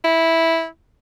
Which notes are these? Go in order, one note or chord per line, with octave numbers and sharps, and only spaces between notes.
E4